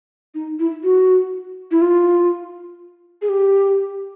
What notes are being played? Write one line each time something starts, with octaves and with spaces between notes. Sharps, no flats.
D#4
E4
F#4
E4
F4
G#4
G4